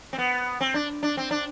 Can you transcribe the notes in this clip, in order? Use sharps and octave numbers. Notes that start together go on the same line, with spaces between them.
C4
B3
C4
D4
D4
C4
D4